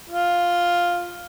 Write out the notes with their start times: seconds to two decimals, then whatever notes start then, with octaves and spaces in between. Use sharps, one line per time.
0.09 F4